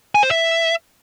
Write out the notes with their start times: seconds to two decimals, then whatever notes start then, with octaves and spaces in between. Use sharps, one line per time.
0.15 G#5
0.23 C5
0.31 E5